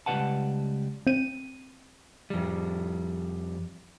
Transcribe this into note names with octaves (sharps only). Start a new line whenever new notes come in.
C#2 E3 G3 B4 F#5 A5
C4 D#7
F2 G3